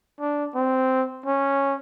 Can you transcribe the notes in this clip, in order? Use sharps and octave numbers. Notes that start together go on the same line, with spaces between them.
D4
C4
C#4